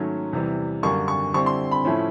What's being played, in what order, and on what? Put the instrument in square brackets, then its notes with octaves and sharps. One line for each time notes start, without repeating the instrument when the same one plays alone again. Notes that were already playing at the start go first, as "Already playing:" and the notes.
Already playing: [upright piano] G#2 D#3 F#3 A3 C#4
E2 C3 E3 G3
F#2 D3 G3 A#3 D4 C#6
C#6
D3 G3 C4 E4 C#6
C6
B5
A2 F3 A3 C#4 E4